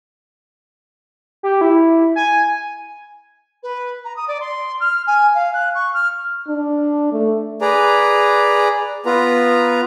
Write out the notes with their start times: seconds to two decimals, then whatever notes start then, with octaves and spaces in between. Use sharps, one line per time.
1.43 G4
1.61 E4
2.16 G#5
3.63 B4
4.04 A#5
4.16 D#6
4.28 D5
4.40 C6
4.80 F6
5.07 G#5
5.34 F5
5.53 F#6
5.74 C#6
5.93 F6
6.48 D4
7.12 A3
7.61 G#4 B4 D5 A#5
9.06 B3 F4 B4 A#5